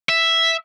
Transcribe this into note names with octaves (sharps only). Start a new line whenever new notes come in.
E5